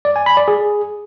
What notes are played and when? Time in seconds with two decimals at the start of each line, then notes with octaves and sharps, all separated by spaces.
0.05 D5
0.16 G#5
0.26 B5
0.37 D5
0.48 G#4